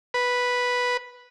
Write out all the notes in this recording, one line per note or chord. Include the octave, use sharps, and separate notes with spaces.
B4